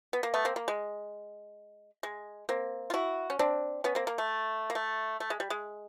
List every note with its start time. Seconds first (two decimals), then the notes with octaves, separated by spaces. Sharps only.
0.13 B3
0.23 A#3
0.34 A3 B3
0.45 A#3 C4
0.56 A#3
0.68 G#3
2.03 G#3
2.49 A#3 C4
2.90 F4
2.94 E4 F#4
3.30 C#4
3.39 C4 D4
3.84 B3 C#4
3.95 A#3 C4
4.07 A#3
4.18 A3
4.70 A#3
4.75 A3
5.20 A3
5.30 G#3
5.40 G3
5.50 G#3